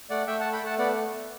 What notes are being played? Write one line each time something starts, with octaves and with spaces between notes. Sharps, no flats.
A3 D5 F#5
A3 E5 G5
A3 F#5 A5
G5 B5
A3 F#5 A5
B3 D5 F#5